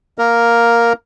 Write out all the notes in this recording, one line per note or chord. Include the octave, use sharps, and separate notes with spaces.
A#3 A#4